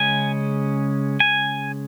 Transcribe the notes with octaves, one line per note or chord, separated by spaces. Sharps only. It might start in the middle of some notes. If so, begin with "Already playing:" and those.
Already playing: C#3 G#3 C#4 G#5
G#5